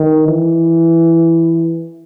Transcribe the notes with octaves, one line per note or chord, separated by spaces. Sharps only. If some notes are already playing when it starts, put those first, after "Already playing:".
Already playing: D#3
E3